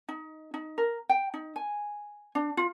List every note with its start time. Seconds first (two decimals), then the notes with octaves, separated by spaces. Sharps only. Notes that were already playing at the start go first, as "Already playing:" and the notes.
0.09 D#4
0.54 D#4
0.78 A#4
1.09 G5
1.34 D#4
1.56 G#5
2.35 D4
2.57 F4